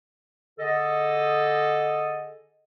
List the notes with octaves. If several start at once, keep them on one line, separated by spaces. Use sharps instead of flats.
D3 G#4 A4 D#5